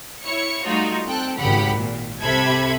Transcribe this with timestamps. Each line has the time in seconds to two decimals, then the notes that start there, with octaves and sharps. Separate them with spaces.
0.23 E4 C#5 C#7
0.64 G3 A3 D#4 F4 F#4
1.06 C4 A4 G5 F#6
1.38 G#1 C#3 G4 F#5 B5
1.76 A#2
2.20 C2 C3 A4 E5 B5 G#6